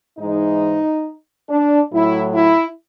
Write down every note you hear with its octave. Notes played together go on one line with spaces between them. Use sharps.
G#2 E3 G#3 D#4
D4
A2 F#3 E4
E4